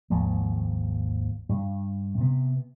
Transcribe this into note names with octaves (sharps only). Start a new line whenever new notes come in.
G#1 D#2 F3
G2
C3 B3